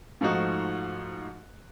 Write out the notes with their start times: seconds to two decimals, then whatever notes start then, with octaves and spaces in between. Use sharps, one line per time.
0.21 G#2 F3 A3 D#4 F#4